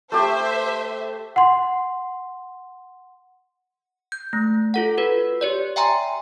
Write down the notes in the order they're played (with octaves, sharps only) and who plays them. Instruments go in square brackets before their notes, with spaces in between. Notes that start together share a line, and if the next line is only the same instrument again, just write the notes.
[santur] A3 G4 [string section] C5 E5
[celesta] F#5 C6
[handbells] G6
A3
F4 A4 F#5
F#4 B4
G4 C#5 D5
E5 G5 G#5 A#5 C6